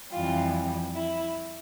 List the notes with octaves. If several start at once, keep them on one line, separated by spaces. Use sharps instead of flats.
F2 E3 G3 F4
E4